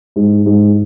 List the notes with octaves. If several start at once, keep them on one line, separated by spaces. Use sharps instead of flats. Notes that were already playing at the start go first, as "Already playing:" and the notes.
G#2
G#2